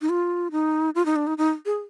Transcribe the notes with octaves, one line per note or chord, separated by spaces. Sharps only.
D#4
F4
D#4
F4
D#4
D4
D#4
D#4
G#4